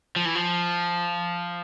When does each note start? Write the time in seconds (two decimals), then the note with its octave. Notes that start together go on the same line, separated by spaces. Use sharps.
0.16 F3
0.25 E3
0.35 F3